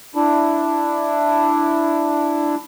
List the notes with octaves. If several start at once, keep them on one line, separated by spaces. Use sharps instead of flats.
D4 E4